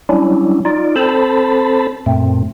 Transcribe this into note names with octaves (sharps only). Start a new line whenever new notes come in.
F#3 G3 C#4 D4 E4
D#4 F4 D5
C4 A4 C5 A5 B5
F#2 A#2 A3 C4